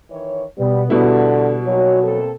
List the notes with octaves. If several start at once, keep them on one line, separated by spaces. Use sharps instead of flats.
D#3 E3 C#5
B2 G3 B3
B2 D3 G3 E4 F#4
A#2 F#3 D#4 C#5
A#3 C4 A4